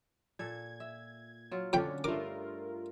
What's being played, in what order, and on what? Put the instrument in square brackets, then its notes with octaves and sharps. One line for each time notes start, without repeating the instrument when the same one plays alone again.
[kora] A#2 A4 [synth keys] G#6
[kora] E5
F#3 F4
[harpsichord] F2 G5 B5 [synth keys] D3 C#4 [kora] D4 C#5
[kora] G2 A3 [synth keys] F4 A#4 [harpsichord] D6